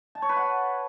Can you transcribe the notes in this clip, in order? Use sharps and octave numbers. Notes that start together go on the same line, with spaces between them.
A5
C#5
B4
F#5